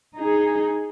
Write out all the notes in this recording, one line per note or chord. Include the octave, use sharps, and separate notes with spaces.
D#4 G#4